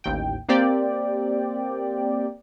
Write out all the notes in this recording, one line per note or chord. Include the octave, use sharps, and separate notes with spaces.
A1 D#2 G5
A#3 C4 G4 D5 G5